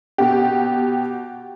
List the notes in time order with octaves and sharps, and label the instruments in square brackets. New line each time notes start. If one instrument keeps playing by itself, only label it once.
[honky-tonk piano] B2 G4